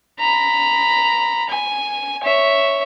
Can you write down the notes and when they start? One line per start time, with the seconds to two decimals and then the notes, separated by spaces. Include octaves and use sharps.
0.19 A#5 B5
1.49 G#5
2.23 C#5 E5